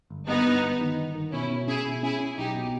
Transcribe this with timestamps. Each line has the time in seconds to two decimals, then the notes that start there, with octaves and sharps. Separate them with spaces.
0.10 G1
0.27 G2 B3 D#4
0.45 G2
0.62 G1
0.80 D#3
0.98 G1
1.15 D#3
1.32 B2 C#4 E4
1.51 B2
1.67 C#4 E4 G#4
1.86 B2
2.03 C#4 E4 G#4
2.20 C#4
2.38 B1 D#4 G4
2.55 B2